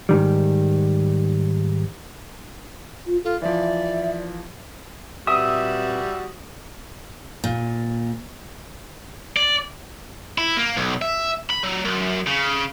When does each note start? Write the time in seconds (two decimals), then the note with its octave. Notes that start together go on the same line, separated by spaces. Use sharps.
0.09 G#2 D#3 G3
3.06 F4
3.24 F4 A4
3.42 E3 F3 D5 E5
5.27 A#2 G3 C4 F#4 B4 E5 D#6
7.44 A#2
9.36 D5
10.38 E4
10.57 A#3
10.77 B1
11.02 E5
11.50 B5
11.63 F#3
11.85 F#2
12.27 C#3